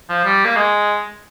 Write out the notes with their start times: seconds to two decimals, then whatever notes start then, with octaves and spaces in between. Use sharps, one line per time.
0.09 F3
0.25 G3
0.45 A#3
0.57 G#3